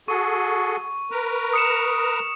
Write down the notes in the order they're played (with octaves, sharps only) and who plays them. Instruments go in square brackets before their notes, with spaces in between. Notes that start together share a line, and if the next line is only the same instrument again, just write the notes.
[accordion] F#4 G#4 A4 [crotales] C#6
[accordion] A#4 B4 A#5
[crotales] D#6 C#7 E7